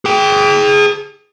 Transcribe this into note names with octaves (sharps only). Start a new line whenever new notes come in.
G#4 G5